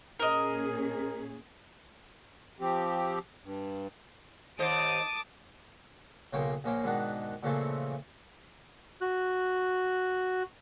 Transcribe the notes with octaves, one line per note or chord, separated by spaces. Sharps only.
A#2 C#4 G#4 A#4 D#5
F3 C4 G4
G2
D#2 C5 D#5 A5 D6 D#6
B1 C#3 A#3 C5 C#5 G5
A#1 A#3 C#4 C5 G5
G#2 B2 D#3 D4 F#5
A#2 C#3 E3 F3 A3 C4
F#4 F#6